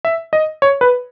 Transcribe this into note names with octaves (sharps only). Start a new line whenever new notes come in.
E5
D#5
C#5
B4